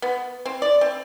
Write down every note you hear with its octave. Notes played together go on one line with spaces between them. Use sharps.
B3
C4
D5
C4